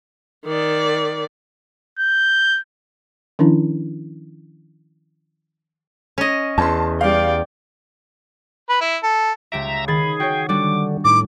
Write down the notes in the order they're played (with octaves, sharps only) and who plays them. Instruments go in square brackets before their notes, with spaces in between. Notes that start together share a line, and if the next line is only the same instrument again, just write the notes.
[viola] D#3 D5
[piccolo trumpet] G6
[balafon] D#3 F3 C#4 D4 E4
[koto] C#4 D#5
[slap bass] E2 [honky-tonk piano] A5 C6
[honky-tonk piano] G3 F5 [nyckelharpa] D5 G5
[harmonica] B4
E4
A4
[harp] C#2 G4 D7 [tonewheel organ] E5 A#5
[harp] D#3 A6 [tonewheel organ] G#4 [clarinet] B5
[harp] F#4 C#5 [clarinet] G5
[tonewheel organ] D3 [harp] G3 D4 F#4 [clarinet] D6
[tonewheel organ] A2 [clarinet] D#4 [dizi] D6